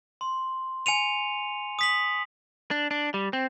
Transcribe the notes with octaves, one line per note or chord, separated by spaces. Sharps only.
C6
G#5 C#7 D#7 F7
D#6 B6 F#7
D4
D4
G3
C4